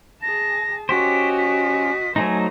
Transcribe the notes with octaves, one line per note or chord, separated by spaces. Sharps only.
G#4 A5 A#6
C#4 F#4 G4 C5 D#5 B6
B6
F#3 A3 D#4 C5 G#5 A#5